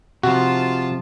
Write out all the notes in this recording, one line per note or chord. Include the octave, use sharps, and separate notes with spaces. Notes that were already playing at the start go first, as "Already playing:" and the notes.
C3 F3 F4 F#4 A5